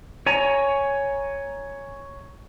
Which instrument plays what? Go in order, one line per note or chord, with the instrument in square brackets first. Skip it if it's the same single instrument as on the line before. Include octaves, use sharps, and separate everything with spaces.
[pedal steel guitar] C#5 G#5 A#5